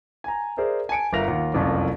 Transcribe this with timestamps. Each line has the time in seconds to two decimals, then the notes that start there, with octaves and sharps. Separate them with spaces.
0.24 G#5 A#5
0.57 G#4 A#4 C5 D5 E5
0.89 G#5 A5 C#7 D7
1.13 G1 A#4 E5 F5 A#6 F7
1.28 D#2 F4 F#5
1.53 F#1 C2 F2 C#4 F4 A5